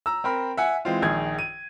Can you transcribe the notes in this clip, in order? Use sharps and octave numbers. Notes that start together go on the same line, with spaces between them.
A#5 E6
C4 A#4 B5
E5 F#5 G#5
E3 G#3 C4 F4
A#1 D#3 G#4 G#6
D#7